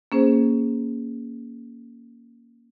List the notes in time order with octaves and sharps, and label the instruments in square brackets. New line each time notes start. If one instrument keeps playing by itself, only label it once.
[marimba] A#3 C#4 G#4 C5